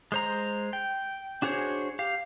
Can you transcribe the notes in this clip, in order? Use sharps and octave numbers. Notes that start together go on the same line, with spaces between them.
G#3 C5 A#5
G5
D4 F#4 G#4 C5 C#5
G4 F5